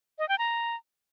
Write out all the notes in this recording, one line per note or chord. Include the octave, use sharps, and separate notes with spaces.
D#5
G5
A#5